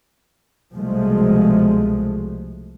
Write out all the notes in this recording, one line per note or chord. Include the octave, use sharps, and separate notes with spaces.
C2 B2 F3 G#3 A3